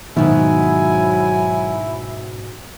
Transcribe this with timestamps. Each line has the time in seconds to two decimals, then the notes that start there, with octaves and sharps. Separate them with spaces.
0.16 G#2 B2 D#3 F#3 E4 G#5